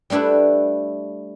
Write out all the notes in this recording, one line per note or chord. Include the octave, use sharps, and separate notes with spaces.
G3 A3 D4 E4 B4